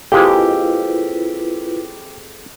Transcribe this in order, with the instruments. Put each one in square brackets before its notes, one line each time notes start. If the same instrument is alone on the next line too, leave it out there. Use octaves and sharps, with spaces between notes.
[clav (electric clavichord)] F2 G#3 A#3 [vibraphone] E4 F4 B4 [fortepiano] G4